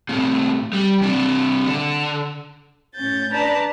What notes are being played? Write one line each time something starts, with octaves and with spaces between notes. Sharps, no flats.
A2 C3
G3
C3 D4
D3
A2 C#4 G6 A6
D4 B4 D5 A5 A#5